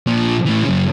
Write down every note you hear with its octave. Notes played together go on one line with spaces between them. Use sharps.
A#2 F3
A2 E3
F#2 C#3